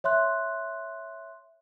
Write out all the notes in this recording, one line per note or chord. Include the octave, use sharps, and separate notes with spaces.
C#5 E5 C6 F#6